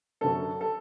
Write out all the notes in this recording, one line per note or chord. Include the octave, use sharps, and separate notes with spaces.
F#2 D3 F#3 A4
A4